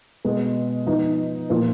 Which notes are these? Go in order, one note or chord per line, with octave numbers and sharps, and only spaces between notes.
B2 G#3 B3
F3 B3 D#4
A#2 F3 A#3 F4 B4